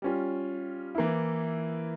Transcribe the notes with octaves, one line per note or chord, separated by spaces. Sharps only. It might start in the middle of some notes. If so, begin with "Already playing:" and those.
G3 C#4 F4
E3 A#3 E4